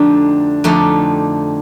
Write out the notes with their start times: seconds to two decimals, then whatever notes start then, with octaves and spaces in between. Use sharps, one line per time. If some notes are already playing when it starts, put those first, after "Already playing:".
Already playing: F2 D3 A3 D4 D#4 G4
0.64 F2 D3 A3 D#4 G4